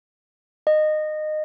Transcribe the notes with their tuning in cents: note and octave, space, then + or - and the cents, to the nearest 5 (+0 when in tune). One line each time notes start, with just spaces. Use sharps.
D#5 -20